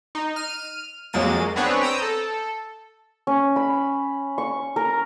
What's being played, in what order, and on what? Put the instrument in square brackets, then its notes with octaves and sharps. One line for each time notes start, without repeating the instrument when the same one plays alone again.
[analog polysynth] D#4
F6 D#7
F2 F#3 G#3 A#3 A6 D#7
B3 C4 D4 G#4 B4 C#5
G5 A#5 D#6 E6
A4
[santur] C#4
B5
C#6
A#4